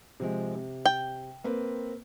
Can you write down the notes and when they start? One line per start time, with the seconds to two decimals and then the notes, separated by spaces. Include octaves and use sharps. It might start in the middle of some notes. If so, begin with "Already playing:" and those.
0.20 C3 F3 G#3
0.55 C3
0.86 G5
1.44 A#3 C4 B4